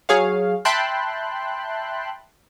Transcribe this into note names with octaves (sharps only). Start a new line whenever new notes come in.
F#3 G#4 C#5 F5
E5 G5 A5 B5 C6 F#6